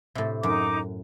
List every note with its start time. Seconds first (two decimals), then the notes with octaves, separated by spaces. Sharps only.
0.15 A2 C3
0.43 F#2 D#4 D6